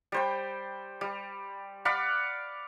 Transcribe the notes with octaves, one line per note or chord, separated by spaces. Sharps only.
G3 C5 G5
G3
D5 F5 F#5 B5